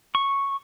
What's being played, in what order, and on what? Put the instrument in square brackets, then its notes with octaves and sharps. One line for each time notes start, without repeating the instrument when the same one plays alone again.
[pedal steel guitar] C#6